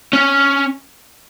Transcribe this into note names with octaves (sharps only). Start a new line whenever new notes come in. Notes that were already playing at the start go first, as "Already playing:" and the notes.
C#4